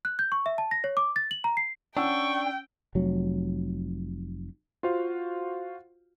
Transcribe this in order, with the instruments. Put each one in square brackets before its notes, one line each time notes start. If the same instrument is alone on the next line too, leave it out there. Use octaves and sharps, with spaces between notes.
[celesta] F#6
G6
C#6
E5
A5
A#6
C#5
D6
A6
F#7
A#5
C7
[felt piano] C#4 F#5 E6 [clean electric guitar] D4 [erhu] G5 [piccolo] C#6
[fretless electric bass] F1 F#3
[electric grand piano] F4 F#4 C5 F5